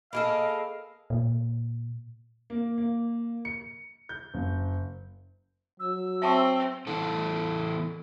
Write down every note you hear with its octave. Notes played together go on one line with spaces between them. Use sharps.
A#3 G#4 A4 D#5 F5 B5 D7
A#2
A#3
A#3
C#7
G6
F#1
F#3 E6
C4 E5 A5 C#6
E3 B3 E4 A4